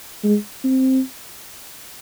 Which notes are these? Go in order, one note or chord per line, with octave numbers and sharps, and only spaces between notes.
G#3
C4